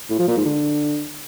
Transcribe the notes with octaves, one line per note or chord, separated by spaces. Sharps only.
A2
F3
A#2
G#2
D3